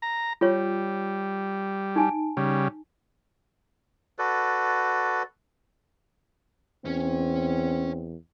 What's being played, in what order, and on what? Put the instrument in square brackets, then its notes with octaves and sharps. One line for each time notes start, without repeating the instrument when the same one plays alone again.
[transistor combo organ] A#5
[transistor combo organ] G3 [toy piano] F4 C#5
[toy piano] D#4 G#5 A5
[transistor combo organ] C#3 G3
[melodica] F#4 A4 B4 D5
[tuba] E2 [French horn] C4 [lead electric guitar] C#4 C#5